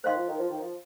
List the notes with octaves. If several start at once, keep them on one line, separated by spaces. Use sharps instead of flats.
D#3 C5 F5 C6
F3
D#3
F3
D#3
F3